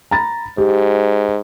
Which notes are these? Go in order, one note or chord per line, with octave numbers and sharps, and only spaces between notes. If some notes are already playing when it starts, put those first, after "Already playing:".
A#5 B5 A6
G#2 G4